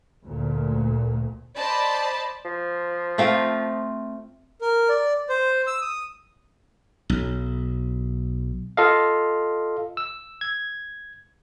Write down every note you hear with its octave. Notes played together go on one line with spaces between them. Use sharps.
D2 A#2
C5 D5 D#5 A5 B5
F3
A3 C4 F4
A#4
D5
C5
E6
D#6
B1
F4 A4 D#5 F5
E6
G#6